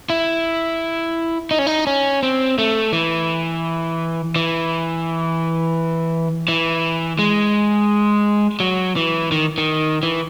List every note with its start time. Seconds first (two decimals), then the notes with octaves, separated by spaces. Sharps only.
0.10 E4
1.51 D#4
1.59 C#4
1.67 D#4
1.87 C#4
2.23 C4
2.58 A3
2.93 E3
4.36 E3
6.48 E3
7.19 G#3
8.60 F#3
8.96 E3
9.32 D#3
9.58 D#3
10.03 E3